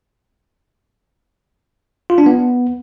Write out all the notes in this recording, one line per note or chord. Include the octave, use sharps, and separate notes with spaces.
F4
D4
B3